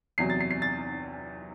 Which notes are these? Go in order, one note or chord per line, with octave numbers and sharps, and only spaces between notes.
E2 C3 F#3 C7
A6
C7
C7
A6